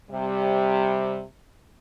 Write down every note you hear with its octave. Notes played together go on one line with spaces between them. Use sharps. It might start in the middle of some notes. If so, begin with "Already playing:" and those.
C3 G3